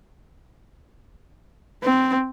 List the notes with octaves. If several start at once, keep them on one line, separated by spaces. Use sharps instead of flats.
C4